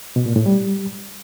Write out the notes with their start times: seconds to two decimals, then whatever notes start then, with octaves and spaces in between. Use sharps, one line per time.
0.16 B2
0.26 A#2
0.36 A2
0.46 G3